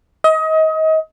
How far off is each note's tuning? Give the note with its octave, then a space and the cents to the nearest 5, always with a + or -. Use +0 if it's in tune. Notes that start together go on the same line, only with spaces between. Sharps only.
D#5 +30